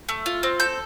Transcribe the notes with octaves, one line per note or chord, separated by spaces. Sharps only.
A3
F4
C4
A4 G6